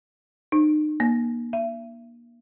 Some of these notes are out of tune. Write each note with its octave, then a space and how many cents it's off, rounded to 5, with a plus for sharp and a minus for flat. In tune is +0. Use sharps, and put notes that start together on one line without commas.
D#4 -35
A#3 +30
E5 +35